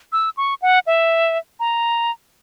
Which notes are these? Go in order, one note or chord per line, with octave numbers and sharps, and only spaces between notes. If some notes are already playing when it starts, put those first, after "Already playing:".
E6
C#6
F#5
E5
A#5